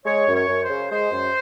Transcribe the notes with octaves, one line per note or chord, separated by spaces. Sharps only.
G#3 C#5
F#2
C#5
F#2
C5
C#3
G#3 C5
F#2